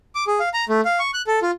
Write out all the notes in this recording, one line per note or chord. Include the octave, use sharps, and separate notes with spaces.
D6
G#4
F5
A#5
A3
F5
C#6
F#6
A4
F4